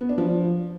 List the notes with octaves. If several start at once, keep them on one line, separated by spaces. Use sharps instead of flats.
B3
D4
F3